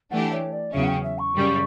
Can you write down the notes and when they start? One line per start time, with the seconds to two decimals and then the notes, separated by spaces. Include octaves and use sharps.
0.11 E3 A3 D4 G4 F#5
0.31 C#5
0.52 D5
0.72 E2 C#3 F#3 C#4 E5
0.83 F#5
0.87 G5
1.03 E5
1.18 C#6
1.34 F#2 C#3 G3